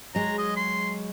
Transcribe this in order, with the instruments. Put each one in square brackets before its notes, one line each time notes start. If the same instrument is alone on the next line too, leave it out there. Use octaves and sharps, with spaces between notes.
[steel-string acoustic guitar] F#3 G#3 [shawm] A#5
[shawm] D#5
C6